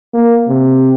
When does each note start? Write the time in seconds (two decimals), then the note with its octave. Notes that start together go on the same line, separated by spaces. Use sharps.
0.14 A#3
0.48 C3